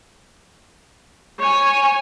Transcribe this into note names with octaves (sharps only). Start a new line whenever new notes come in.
C#5 G#5